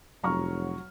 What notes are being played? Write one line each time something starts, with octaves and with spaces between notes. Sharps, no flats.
F1 F#3 A#5 C#6 F6